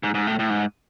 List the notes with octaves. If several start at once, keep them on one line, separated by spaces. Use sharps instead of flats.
G#2
G#2
A2
A2
G#2